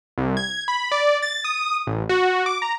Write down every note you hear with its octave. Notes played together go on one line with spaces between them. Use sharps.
C2
G#6
B5
D5
A6
D#6
A1
F#4
D6
A#5